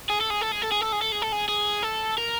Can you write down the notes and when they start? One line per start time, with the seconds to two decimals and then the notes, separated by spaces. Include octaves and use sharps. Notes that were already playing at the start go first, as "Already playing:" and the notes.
0.10 G#4
0.20 A4
0.30 G#4
0.41 A4
0.52 G#4
0.62 A4
0.71 G#4
0.81 A4
0.92 G#4
1.02 A4
1.12 G#4
1.22 A4
1.32 G#4
1.48 G#4
1.83 A4
2.18 A#4